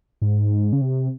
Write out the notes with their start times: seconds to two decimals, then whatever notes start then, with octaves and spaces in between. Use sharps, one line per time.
0.22 G#2
0.73 C#3
0.81 C3